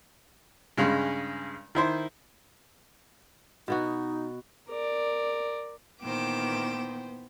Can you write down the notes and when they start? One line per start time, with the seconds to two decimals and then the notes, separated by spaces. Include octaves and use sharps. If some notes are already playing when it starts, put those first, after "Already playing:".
0.77 G2 C#3 G#3
1.75 D#3 E4 C5
3.68 B2 B3 D#4 F#4
4.69 A#4 D5
6.02 A#2 D#3 E3 B3 C5 G5 D6 E7